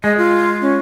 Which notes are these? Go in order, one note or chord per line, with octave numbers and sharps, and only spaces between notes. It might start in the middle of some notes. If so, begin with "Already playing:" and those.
G#3 D#5
F4
C#4